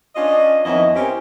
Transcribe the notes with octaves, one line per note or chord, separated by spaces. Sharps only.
C#4 D4 F4 D#5
F2 D#3 B3 C#4 E4 D#5
C4 C#4 E4 G4 A#4 C#5